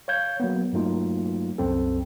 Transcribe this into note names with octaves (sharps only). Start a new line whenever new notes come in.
C#5 F5 G6 G#6
F#3 A#3 B3
G2 F#3 A3 A#3 D#4 F4
C2 F#2 C4 A4